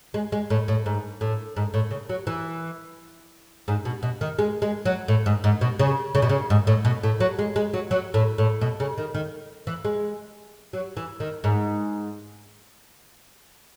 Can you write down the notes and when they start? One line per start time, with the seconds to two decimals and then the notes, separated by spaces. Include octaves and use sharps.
0.14 G#3
0.32 G#3
0.50 A2
0.68 A2
0.86 G#2
1.21 A2
1.56 G#2
1.74 A2
1.91 C#3
2.09 F#3
2.27 E3
3.68 G#2
3.85 B2
4.03 B2
4.21 D#3
4.39 G#3
4.62 G#3
4.85 F#3
5.08 A2
5.26 G#2
5.44 G#2
5.61 B2
5.79 C#3
6.15 C#3
6.22 B2
6.29 C#3
6.50 G#2
6.67 A2
6.85 B2
7.03 A2
7.20 F#3
7.39 G#3
7.56 G#3
7.74 F#3
7.91 F#3
8.14 A2
8.38 A2
8.61 B2
8.80 C#3
8.98 D#3
9.14 D#3
9.67 E3
9.85 G#3
10.73 F#3
10.97 E3
11.20 D#3
11.44 G#2